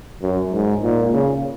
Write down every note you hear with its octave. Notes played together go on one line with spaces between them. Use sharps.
F#2
G#2
A#2
C#3